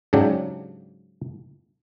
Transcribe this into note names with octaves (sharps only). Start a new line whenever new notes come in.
G#2 C#3 F#3 D4 G4